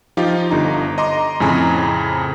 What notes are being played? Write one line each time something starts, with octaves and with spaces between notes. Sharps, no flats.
F3 D#4 F4 G4
G1 D3 D#4 A#5
D#5 A#5 C6 D6
F2 A2 C#3 G#5 A#5